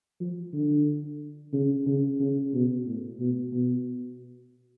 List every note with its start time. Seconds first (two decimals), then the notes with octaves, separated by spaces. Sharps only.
0.20 F3
0.54 D3
1.53 C#3
1.87 C#3
2.20 C#3
2.54 B2
2.86 A2
3.19 B2
3.53 B2